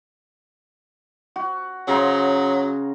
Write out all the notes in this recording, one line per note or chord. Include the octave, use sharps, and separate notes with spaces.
F#4
C#3 F#3 A#5 C6